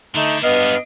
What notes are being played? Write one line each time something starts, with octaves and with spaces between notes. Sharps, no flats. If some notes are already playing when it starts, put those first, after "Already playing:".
D3 A3 D#4
G2 B3 D4 D#5 F5 F6